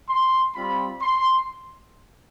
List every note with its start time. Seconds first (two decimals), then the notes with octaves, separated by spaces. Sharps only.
0.09 C6
0.54 G3 C4 F4 B5
1.01 C6